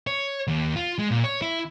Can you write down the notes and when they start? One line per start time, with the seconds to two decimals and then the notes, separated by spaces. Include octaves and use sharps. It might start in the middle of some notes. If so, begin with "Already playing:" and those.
0.07 C#5
0.48 D#2
0.76 F4
0.98 G#3
1.11 A#2
1.24 C#5
1.42 E4